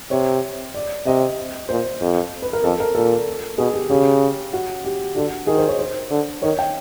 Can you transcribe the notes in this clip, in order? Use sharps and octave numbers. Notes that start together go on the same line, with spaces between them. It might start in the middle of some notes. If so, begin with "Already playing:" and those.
C3 C#5
D5
C3 D#5
A#2 C5
F2
B4
A#4
F2 A4
A#4
A#2 A4
B2 G#4
G4
C#3 G4
F#4
G4
D3 F#4
D#3 G#4
C5
C#5
C5
D3
D#3 C#5
G5